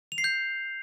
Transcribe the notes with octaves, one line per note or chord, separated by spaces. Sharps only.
F7
C7
G6